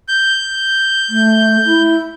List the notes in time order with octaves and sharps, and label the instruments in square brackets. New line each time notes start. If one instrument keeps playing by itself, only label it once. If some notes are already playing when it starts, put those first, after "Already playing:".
[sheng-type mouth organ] G6
[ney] A3
E4